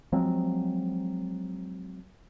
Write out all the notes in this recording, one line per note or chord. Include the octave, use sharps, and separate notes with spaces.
F3 F#3 G#3 C4